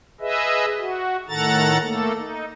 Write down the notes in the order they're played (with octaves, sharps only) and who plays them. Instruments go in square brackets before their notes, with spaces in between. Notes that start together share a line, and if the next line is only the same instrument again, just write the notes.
[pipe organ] G#4 B4 D#5 E5
F#4
A2 D#3 A4 F#5 A#5 A6
A3 A#3 A4
D#4